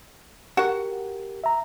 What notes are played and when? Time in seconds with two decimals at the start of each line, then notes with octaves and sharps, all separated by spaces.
0.57 F#4 G4 A#4 F#5
1.44 E5 A#5